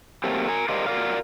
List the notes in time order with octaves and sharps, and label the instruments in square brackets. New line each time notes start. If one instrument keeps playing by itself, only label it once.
[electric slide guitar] F#3 A3 A#3 C4 G4
A#4 G#5
G4 A#4 C5 D5 D#5 F5
F#4 A#4 D5 F5